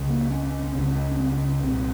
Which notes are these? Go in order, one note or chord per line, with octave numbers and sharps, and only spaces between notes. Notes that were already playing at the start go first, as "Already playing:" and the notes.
Already playing: C#2 C#3
A#3
C#4
C#4
C#4
C#2 C#3 C#4
C4
C#4
C#4
C4
C#4
C#4
C2 A#2 C4